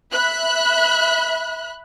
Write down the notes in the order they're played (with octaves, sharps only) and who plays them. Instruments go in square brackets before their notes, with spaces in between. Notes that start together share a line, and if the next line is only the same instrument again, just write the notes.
[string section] E5 B5 F#6